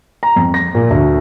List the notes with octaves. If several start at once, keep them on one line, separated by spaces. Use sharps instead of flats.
A#5
F2
A#6
A#2
D2